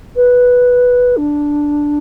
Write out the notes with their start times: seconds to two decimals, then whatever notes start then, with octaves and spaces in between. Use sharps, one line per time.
0.16 B4
1.17 D4